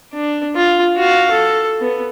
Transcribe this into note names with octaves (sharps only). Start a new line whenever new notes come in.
D4
F4
F#4 F5
A4
B3